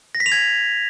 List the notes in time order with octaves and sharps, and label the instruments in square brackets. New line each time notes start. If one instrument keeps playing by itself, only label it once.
[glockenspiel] A#6
B6
F7
G#6